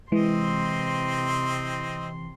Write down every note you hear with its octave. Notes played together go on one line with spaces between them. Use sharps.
C3 E3 G#3 C4 D#5 C6